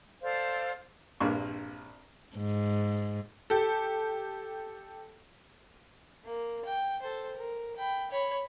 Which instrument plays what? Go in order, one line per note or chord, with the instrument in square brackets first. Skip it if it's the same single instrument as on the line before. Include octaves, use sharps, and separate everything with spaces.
[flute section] A4 C5 D5 F5
[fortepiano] A#1 G2 A#3 C4 C6 C#6
[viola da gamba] G#2
[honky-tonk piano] G4 A4
[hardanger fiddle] A#3
G5
A4 C5
A#4
G5 B5
C#5 B5